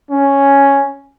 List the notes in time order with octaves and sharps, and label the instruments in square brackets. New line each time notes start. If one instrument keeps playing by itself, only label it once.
[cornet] C#4